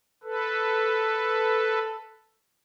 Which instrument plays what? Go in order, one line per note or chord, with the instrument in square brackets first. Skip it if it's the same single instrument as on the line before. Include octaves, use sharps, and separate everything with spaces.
[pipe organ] A4 B4